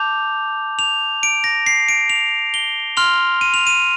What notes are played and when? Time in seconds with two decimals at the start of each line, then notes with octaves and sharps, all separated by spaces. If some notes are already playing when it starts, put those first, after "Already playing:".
Already playing: A5 D6 G6 F7
0.79 F7
1.23 D7
1.44 A#6
1.66 C7
1.89 D7
2.10 F7
2.54 G7
2.97 C6 F6 F7
3.41 D#7
3.54 F7
3.67 D#7